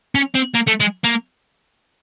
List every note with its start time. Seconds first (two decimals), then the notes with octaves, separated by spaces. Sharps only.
0.15 C#4
0.35 C4
0.54 A#3
0.67 A3
0.80 G#3
1.04 A#3